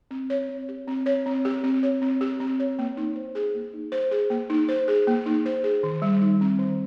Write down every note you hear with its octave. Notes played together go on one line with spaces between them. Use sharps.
C4
C#5
C4
G4
C4
C#5
C4
G4
C4
C#5
C4
G4
C4
C#5
A#3
D#4
C5
G#4
A#3
D#4
C5
G#4
A#3
D#4
C5
G#4
A#3
D#4
C5
G#4
D#3
G3
D#4
C4
D#3